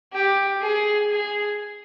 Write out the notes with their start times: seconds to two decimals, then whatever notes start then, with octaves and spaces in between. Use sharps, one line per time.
0.13 G4
0.61 G#4
1.10 G#4